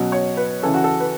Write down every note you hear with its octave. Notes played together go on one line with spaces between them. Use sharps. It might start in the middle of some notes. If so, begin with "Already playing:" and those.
Already playing: B2 F#3 C#4
C#5
B4
C#3 E3 C#4 A4
F#4
A4
B4